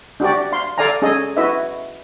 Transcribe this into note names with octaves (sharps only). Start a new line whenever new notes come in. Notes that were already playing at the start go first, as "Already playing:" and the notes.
D4 F#4 G4 D5
F5 C6
A4 D5 F5 G#5 A#5
C#4 G#4 A4 D#5
E4 F#4 B4 D#5 E5